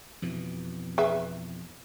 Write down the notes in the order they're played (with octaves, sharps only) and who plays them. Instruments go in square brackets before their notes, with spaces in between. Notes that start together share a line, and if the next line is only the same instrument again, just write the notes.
[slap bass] F2 B2 E3
[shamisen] G#4 B4 E5